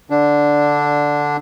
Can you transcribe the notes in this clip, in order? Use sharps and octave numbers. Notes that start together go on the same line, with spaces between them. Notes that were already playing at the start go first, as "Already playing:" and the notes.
D3 D4